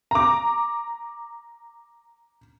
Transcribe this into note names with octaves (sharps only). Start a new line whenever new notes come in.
A#5 D6